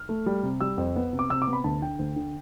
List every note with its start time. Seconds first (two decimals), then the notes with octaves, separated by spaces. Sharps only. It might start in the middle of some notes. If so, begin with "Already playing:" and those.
Already playing: F6
0.09 A3
0.26 G3
0.43 C3
0.61 G3 E6
0.78 F2
0.96 B3
1.13 C3
1.19 D6
1.30 C3 E6
1.42 D6
1.47 B3
1.53 B5
1.64 D2 A5
1.82 D3 G5
1.99 D2
2.16 D3